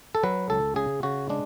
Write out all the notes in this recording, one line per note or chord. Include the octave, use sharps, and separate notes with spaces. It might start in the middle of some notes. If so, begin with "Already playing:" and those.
A4
F#3 B4
C#2 A4
C#3 G#4
C#3 F#4
G#3 D4